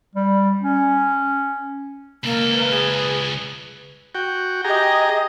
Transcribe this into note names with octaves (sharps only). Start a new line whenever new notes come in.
G3
C#4
C#2 A#3 A4
B4
G#4
F#4 G5
G4 G#4 D#5 A#5